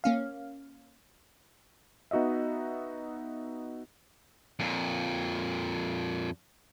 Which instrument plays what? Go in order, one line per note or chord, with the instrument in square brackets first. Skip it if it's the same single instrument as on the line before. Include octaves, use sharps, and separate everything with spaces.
[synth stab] A#3 C#4 F5
[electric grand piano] B3 D#4 F#4 D#5 E5
[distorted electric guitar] F2 A#2